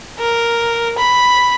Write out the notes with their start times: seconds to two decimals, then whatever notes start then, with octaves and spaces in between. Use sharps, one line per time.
0.19 A#4
0.98 B5